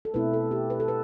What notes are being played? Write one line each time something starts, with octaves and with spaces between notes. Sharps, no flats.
A4
B2 A3 C4 E4 B4
A4
G4
B4
A4
B4